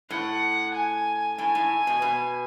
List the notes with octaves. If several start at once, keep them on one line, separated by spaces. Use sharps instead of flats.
A2 F#5
G#5
A2 G#5
A2
B2
B2